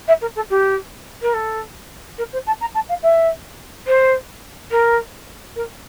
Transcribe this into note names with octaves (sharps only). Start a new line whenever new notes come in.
E5
A#4
A4
G4
A#4
A4
A#4
C5
A5
A#5
A5
F5
E5
C5
A#4
A#4